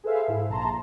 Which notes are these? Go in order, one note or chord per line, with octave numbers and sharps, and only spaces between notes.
G#4 A4 B4 C5 E5 F5
G#2 E4
A#1 A5 A#5 C6